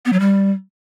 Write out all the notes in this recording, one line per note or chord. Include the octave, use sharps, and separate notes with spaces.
B3
F#3
G3